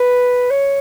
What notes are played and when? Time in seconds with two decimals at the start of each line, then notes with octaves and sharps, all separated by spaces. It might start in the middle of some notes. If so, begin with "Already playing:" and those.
Already playing: B4
0.50 C#5